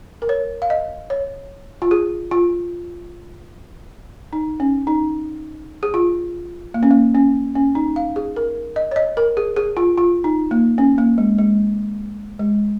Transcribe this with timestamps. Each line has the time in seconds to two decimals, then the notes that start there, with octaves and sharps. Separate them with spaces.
0.22 A#4
0.29 C#5
0.62 F5
0.70 D#5
1.10 C#5
1.82 F4
1.91 G#4
2.31 F4
4.33 D#4
4.60 C#4
4.87 D#4
5.83 G#4
5.94 F4
6.74 A#3
6.83 C#4
6.91 A#3
7.15 C#4
7.55 C#4
7.75 D#4
7.96 F5
8.16 G#4
8.36 A#4
8.76 D#5
8.91 C#5
8.96 D#5
9.17 A#4
9.37 G#4
9.56 G#4
9.77 F4
9.98 F4
10.24 D#4
10.51 A#3
10.78 C#4
10.98 A#3
11.18 G#3
11.38 G#3
12.39 G#3